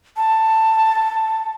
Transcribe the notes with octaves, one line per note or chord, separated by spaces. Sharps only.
A5